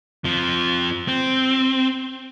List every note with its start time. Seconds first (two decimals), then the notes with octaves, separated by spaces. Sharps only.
0.24 F2 F3
1.08 C4